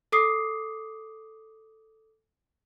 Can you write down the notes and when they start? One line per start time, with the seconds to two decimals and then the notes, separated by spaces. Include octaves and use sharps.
0.12 A4 D6 D#6 C7